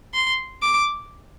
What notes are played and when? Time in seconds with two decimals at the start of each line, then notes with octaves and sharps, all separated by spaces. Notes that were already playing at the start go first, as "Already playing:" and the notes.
0.14 C6
0.63 D6